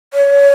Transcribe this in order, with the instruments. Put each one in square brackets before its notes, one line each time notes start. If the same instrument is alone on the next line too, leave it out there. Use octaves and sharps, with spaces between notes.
[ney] C#5